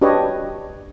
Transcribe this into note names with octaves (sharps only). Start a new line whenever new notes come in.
D4 F#4 G4 B4 C#5 D#5